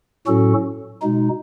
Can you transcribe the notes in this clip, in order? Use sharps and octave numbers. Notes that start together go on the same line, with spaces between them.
A2 F#3 C#4 F#4 A4
B2 G#3 D#4